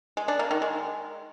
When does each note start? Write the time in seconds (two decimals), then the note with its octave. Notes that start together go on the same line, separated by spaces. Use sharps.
0.17 G#3
0.28 D4
0.39 A#3
0.51 D#3
0.62 G#3